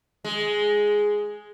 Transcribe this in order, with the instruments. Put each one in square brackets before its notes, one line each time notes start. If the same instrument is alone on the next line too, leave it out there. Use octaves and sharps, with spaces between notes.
[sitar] G#3